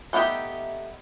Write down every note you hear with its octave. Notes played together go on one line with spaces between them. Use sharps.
A3 B3 D#4 G4 E5